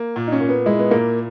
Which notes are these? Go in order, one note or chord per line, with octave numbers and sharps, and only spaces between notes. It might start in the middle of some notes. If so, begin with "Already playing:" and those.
Already playing: A#3
A#2
D#4
C#4
A#2
B3
G#3 E4
B3
A#2 A#3